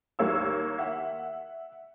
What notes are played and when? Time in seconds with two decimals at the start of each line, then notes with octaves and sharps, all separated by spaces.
0.19 D#2 G3 A#3 C#5 E6
0.79 E5 F#5